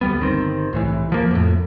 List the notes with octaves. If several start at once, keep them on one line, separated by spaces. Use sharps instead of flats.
D2 G3 B3
G1 D#3 C4
C2 A2 E3
D1 F3 A#3
F2 A2